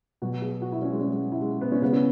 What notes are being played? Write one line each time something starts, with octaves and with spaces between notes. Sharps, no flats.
B2 F#3 F#4
G#4
F#4
E4
C#4
G#3
C#4
G#3
E4
G#3
B3
C#4
C#3 G#3 B3
C#4